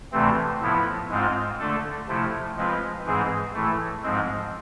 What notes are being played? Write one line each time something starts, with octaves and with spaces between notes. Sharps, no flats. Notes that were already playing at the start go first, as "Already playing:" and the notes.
D2 C3 E3 A3 C4
A2 F3 B3 E4
G#2 G#3 C4 F4
D3 A3 D4 A4
C3 F3 A3 E4
F3 G#3 C4 F4 B4
G#2 E3 G#3 C4 G#4
A2 E3 A3
G#2 F3 G#3 C4